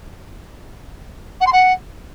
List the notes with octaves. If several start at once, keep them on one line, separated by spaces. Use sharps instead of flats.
F#5
C6
F#5